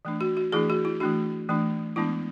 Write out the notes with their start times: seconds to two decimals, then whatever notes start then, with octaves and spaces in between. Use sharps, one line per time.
0.05 E3 A3 D4
0.21 F#4
0.37 F#4
0.52 E3 A3 D4 E4 G#4
0.70 F#4
0.85 E4
1.00 E3 A3 D4 F#4
1.49 E3 A3 D4
1.96 E3 G#3 B3 D4 E4